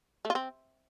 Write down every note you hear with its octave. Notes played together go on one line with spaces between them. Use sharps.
A3
F4
C4